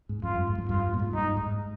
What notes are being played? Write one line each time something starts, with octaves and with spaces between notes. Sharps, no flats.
G#2
F2 F4
G2
G#2
F2
G2 F4
A#2
G#2
G2 D#4
G#2